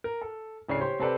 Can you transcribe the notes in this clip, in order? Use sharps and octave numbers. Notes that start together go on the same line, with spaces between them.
A#4
A4
D1 C#3 D4 C#5 C7
G4 C5 C#5 C6
C3 C4 G4 A4 B4 D5